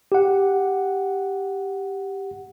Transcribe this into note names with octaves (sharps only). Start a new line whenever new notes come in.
G4 F#5